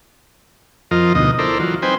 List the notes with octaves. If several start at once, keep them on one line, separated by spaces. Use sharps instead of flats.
F2 F3 F4 A#4 D#5
D2 B2 D#4 D#5
E4 A4 A#4 C5 D5
E3 F#3 F4
C4 D#4 B4 C5 G5 G#5